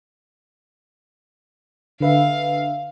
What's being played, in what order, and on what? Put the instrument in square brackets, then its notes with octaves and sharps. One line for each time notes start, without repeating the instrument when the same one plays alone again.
[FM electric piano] D3 B4 E5 [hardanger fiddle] F5